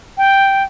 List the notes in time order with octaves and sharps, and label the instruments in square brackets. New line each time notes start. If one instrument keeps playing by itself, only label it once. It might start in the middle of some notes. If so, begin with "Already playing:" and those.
[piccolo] G5